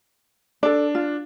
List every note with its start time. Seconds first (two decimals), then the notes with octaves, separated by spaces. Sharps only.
0.63 D4 A4 D5
0.95 F4